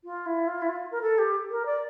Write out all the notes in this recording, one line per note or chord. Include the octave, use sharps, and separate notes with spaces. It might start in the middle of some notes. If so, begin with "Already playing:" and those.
F4
E4
F4
E4
F4
A#4
A4
G4
A#4
D5